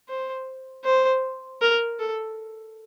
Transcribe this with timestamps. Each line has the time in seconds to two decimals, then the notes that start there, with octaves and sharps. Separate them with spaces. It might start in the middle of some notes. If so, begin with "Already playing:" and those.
0.08 C5
0.85 C5
1.61 A#4
1.99 A4